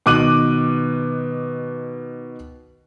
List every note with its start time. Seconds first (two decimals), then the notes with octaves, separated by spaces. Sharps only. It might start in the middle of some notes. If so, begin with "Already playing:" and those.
0.06 B2 D#3 D6 F#6 D#7 F#7